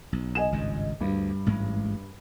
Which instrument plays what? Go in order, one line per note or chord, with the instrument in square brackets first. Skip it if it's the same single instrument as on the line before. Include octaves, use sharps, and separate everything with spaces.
[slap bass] B1
[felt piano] D#5 G#5 E7
[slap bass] G#1 C#2 G2
[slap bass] D2 [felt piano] G2
[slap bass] A1 G#2 G#3